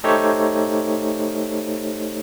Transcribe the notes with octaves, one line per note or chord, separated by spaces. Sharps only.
A3 D#4 G4 A4 C5 C#5